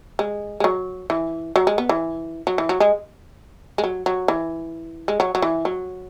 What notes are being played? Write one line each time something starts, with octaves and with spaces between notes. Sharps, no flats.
G#3
G#3
F#3
E3
F#3
G#3
B3
E3
F#3
E3
F#3
G#3
G#3
F#3
F#3
E3
G#3
F#3
F#3
E3
F#3